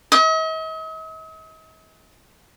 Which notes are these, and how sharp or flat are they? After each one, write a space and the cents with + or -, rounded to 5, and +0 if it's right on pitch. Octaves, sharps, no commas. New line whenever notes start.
D#5 +45